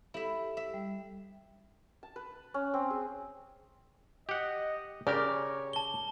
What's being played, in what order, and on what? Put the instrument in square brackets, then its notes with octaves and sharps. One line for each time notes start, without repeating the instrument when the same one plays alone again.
[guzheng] E4 E5 [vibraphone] G4 A4
[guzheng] E5
[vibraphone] G3
[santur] A5
B4
C#4
C4
G#4
[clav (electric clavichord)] G4 F#5 [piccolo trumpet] D#5
[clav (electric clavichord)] C#3 G4 A#4 [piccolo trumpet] C#5 [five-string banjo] D5
[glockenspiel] A5 G7